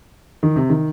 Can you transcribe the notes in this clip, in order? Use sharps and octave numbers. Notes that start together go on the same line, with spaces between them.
D#3
C3
D#3